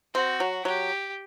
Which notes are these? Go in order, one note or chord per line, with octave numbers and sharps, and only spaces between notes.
C4 F#4
F#3
F#3 G4